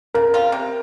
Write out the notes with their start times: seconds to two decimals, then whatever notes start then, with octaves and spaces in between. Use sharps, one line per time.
0.14 C#3 A#4
0.34 F3 C4 F4
0.52 C3